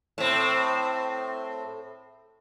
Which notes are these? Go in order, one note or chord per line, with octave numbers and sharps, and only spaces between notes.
A2 C4